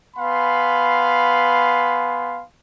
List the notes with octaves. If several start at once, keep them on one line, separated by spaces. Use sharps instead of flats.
B3 F5 G#5 B5 C6